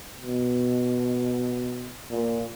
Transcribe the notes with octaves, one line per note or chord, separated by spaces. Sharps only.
B2
A#2